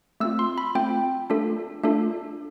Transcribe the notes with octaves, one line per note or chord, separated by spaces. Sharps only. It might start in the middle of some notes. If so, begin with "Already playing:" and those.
A3 C4 F4 E6
C6
B5
A3 C4 F4 G5
A3 D4 F4 A4
A3 D4 F4 A4